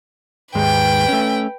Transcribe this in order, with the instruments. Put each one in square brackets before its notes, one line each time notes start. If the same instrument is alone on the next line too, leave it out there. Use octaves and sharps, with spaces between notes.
[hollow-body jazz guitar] D#2 G#2 G#3 [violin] B4 G5
[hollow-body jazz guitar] A3 C#4